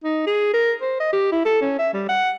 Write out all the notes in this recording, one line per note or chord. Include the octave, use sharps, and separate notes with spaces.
D#4
G#4
A#4
C5
D#5
G4
E4
A4
C#4
E5
G3
F#5